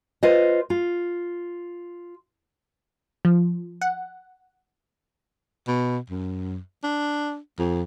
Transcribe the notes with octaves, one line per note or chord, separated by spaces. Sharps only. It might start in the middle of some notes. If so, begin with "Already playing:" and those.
F4 B4 C5 D#5
F4
F3
F#5
B2
F#2
D4
F2